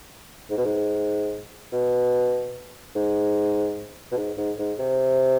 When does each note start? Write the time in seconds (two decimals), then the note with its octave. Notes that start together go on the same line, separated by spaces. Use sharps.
0.50 G#2
0.57 B2
0.65 G#2
1.72 B2
2.96 G#2
4.12 B2
4.17 G#2
4.37 G#2
4.59 G#2
4.79 C3